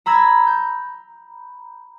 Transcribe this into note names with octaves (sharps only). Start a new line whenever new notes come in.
A#5 B5 E6 G#6 A#6
G6